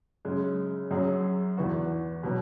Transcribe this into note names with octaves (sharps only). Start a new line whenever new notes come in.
F#2 C#3 G#3
F#2 F#3 C#4 G#4
E2 E3 B3 F#4
B2 F#3 B3